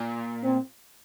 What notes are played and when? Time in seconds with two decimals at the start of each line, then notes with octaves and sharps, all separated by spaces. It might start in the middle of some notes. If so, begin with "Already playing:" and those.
Already playing: A#2
0.44 C4